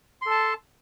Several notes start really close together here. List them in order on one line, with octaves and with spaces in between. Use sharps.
C6 A4 A5